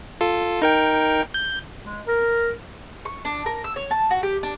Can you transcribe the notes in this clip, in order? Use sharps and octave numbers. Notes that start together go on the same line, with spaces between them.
F4 A4
D#4 A#4 G5
G6
G#3
A#4
C#6
D4
A#4
E6
C#5
A5
F#4
G4
D4